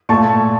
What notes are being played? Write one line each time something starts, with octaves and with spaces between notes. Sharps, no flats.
A#2 A3 A5 C#6